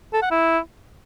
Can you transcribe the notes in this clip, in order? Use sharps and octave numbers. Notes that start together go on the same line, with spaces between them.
A4
F#5
E4